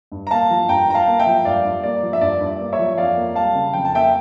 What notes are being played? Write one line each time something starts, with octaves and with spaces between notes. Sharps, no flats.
G2
A#5
A#3 F5 A5
F3
G2 G5 A#5
G2 A#5
F5 A5
A#3
E5 G5
F3
G2 D5 F5
G2
A#3 D5
F3
E5
G2 D5
G2
D5
A#3
C#5 E5
F3
F2 D5 F5
A#3
G3 F5 A5
C#3
F2 G5
A5
A#3 E5 G5